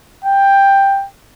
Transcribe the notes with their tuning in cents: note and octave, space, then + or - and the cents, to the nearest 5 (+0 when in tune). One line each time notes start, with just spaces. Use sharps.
G5 +10